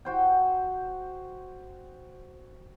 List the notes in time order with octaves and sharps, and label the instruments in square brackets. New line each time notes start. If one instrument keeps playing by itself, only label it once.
[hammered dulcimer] F#4 C5 G5